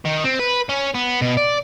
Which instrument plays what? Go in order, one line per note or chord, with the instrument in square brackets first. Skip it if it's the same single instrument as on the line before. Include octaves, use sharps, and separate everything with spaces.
[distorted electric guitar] D#3
C4
B4
C#4
B3
B2
D5